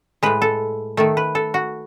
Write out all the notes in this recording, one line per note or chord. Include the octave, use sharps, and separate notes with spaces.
A2 G#3 B4
A4
D#3 A3 A4
B4
A4
F#4